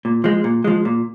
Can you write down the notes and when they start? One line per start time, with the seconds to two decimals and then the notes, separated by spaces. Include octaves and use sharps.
0.05 A#2
0.24 F3 G#3
0.44 A#2
0.64 F3 G#3
0.85 A#2